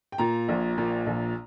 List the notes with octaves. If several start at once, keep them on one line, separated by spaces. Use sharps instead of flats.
G5
A#2 A#5
A#1
A#2
A#1